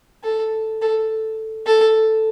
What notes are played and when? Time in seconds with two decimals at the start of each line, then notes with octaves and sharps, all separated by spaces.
0.24 A4
0.82 A4
1.66 A4